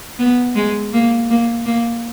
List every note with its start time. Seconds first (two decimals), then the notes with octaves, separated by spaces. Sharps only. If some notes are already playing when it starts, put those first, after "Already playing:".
0.19 B3
0.56 G#3
0.93 A#3
1.30 A#3
1.66 A#3